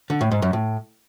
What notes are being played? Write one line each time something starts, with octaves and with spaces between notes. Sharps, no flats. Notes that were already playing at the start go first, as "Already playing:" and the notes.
D3
A2
G#2
F#2
A2